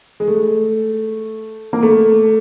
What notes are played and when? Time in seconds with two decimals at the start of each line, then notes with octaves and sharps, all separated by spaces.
0.20 G#3
0.28 A3
1.73 A#3
1.83 A3